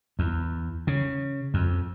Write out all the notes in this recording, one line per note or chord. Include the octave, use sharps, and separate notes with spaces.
E2
C#3
F2